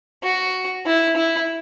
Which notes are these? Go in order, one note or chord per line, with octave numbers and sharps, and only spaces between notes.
F#4
E4
E4